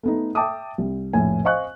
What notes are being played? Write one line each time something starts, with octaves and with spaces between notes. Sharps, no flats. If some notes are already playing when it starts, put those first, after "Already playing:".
A3 B3 D#4
E5 G5 A5 D6 D#6
C2
F1 A#1 A2 G#5
C5 D#5 F5 G#5 C#6 F#6